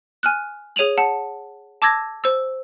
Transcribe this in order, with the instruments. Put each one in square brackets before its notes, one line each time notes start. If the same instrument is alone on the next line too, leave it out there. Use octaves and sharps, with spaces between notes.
[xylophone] G#5 F6 F#6
G#4 C#5 D#7 F7 F#7
F#5 A5
A5 D6 E6 G#6 A#6
C5 E6